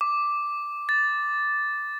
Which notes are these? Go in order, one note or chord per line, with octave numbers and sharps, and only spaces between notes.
D6
A6